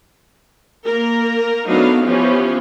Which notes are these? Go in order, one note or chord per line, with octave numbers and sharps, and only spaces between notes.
A#3 A#4
F#3 A3 B3 D4 D#4 F5
E3 F3 B3 C#4 F4 G4